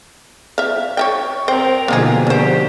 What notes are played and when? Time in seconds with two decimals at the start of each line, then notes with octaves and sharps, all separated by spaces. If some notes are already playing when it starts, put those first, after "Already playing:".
0.58 E5 F5
0.97 C#5 E5 G5
1.48 C4 A#4 C5 G5
1.88 B2 D3 F3 A#3 D#4 G#4
2.27 D3 A#3 G4 C5